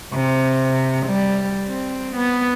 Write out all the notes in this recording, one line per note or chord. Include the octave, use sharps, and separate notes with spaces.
C3
G3
C4
B3